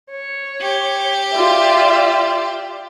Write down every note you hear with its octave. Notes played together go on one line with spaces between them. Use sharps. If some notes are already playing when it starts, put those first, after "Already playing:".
C#5
G4
F4 D5 E5